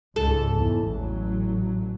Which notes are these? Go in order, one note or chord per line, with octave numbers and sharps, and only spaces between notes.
C#2 G#2 A4
E2
A1 F#3